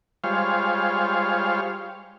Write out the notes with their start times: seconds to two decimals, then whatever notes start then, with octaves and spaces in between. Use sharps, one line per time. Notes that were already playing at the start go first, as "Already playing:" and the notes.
0.24 G3 G#3 F4 C5 C#5 F5